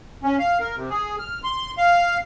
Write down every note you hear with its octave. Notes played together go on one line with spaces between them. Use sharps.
C#4
F5
A#4
C3
G#4
F6
C6
F5